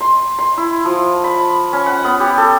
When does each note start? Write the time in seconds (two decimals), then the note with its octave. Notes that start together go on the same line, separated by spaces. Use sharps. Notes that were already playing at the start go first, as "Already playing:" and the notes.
0.01 C6
0.39 C6
0.57 E4
0.85 F3
1.24 B5
1.73 C#4
1.86 F#5
2.05 B3
2.20 G4
2.38 A4